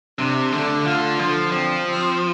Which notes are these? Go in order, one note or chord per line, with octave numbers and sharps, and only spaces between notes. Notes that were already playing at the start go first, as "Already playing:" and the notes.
C3 D4
D3 A3
D3 F4
D3 F3
F3 C4
C4